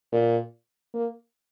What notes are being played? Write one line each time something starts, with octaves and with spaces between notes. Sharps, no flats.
A#2
A#3